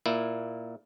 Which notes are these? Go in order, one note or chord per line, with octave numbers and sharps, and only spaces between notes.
A#2 A#3 E4